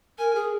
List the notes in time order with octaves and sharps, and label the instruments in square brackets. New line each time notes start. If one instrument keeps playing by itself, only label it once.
[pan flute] A#4 [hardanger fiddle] G#5
[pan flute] G#4